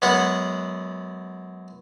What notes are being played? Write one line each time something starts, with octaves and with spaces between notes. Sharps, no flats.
F#2 G#3 B3 F#5